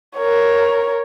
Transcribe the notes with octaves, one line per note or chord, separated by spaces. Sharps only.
A#4 C#5